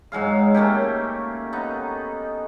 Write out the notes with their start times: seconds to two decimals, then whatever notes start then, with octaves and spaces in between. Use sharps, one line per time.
0.12 G#2 F#3 G#3 F5
0.54 A3 A#3 C#4 G4
1.53 B3 D#4